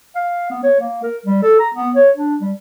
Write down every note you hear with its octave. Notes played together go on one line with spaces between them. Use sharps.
F5
B3
C#5
A#3
A#4
G3
A4
A#5
B3
C#5
D4
G3